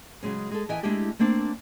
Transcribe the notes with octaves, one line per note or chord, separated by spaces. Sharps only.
C#3 F#3 G#3 C#4
G#3 A4
E3 D#5 E5 G5 G#5
G#3 A3 D4 E4 G4 G#4
A3 A#3 C4 D4